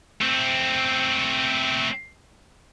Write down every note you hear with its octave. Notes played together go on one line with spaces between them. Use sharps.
A3 C4